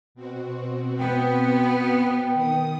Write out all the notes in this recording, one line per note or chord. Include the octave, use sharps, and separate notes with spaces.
B2 C4 F#4
B3 G5
D#3 D#6